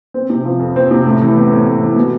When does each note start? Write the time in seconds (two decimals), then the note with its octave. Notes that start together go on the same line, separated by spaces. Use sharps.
0.14 C4
0.30 C3
0.45 F3
0.60 F2
0.76 C4
0.91 C3
1.06 A2
1.21 E3
1.36 B3
1.52 A2
1.67 A2
1.82 E3
1.96 B2